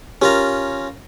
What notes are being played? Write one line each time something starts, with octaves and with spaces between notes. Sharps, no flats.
C#4 F4 G4 A#4 A#5